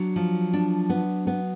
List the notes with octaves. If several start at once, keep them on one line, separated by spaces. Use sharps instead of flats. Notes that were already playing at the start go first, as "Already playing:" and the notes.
Already playing: F#3 D4
F3
D4
B3
B3